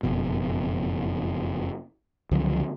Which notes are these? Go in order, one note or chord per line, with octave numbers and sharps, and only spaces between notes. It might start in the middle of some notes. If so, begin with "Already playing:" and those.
F#1 F2 B2
C#2 D3 F3 F#3